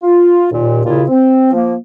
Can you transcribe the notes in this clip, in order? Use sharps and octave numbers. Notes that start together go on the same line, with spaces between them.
F4
D#2 A#2
D#2 A#2 C#3 E4 F4
C4
F3 A#3